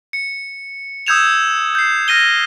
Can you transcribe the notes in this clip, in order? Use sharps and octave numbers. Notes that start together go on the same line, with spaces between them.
C#7
D#6 E6 G6 G#6 E7 F7
G6 C7
F6 A#6 D#7 G7